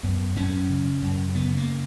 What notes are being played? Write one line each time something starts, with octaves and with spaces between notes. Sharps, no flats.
F#2 B3
F#2 C#4
C#3
F#2
C#3 B3
A#3